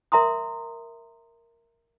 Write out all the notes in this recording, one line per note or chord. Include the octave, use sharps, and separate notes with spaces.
A#4 E5 A#5 C6 D#6